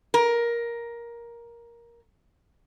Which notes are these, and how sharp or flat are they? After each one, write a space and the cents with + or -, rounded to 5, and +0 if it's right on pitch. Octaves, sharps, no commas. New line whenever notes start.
A#4 +10